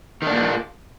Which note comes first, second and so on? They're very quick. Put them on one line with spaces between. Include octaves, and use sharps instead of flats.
D#3 D4 A#2 A#3